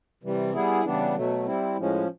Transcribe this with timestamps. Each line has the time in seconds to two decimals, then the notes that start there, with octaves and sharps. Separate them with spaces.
0.23 C3 E3 G3
0.54 G3 B3 E4 G#4
0.85 C#3 E3 G3 B3 D4
1.15 B2 F#3 A3
1.46 G3 C4 E4
1.77 A2 F3 G#3 C#4